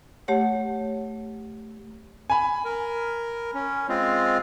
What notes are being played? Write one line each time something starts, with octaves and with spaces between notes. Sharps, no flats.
A3 G4 C#5 F#5
G#5 B5
A#4
C#4
G#3 C4 F4